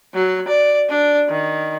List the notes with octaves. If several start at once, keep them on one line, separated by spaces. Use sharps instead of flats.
F#3
D5
D4
D#3